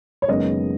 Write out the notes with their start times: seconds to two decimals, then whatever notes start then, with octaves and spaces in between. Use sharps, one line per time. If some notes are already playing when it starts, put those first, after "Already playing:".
0.22 C#5
0.28 F#1 F#2 D#3 G#3 B3 D#5